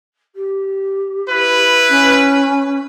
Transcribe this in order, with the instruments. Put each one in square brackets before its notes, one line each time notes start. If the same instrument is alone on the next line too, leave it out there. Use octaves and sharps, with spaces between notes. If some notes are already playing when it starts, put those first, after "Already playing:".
[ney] G4
[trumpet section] E4 B4
[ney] C#4